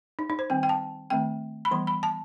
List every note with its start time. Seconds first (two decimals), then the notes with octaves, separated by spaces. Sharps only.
0.19 D#4
0.30 D#4
0.39 C5
0.50 D#3 G3 C4 G5
0.63 G5
0.69 A5
1.10 D#3 A3 C4 G5
1.65 B5
1.71 E3 G3 B3 C6
1.87 B5
2.03 A5